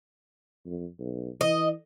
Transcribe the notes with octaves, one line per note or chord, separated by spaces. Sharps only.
F2
B1
E3 D#5